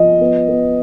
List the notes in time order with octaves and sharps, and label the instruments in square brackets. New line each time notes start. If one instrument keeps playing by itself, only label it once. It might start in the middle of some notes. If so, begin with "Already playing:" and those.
Already playing: [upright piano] F3 D#5
B3
B3